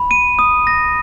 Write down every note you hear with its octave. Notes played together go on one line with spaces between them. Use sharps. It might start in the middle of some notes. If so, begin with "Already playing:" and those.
Already playing: B5
D#7
D#6
A#6